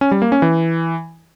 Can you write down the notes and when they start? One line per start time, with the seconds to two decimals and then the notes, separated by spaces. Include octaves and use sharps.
0.01 C#4
0.11 G3
0.22 A#3
0.32 C#4
0.42 E3